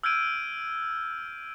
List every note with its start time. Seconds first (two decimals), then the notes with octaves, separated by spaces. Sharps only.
0.03 E6 F6 G6 G#6 D7 D#7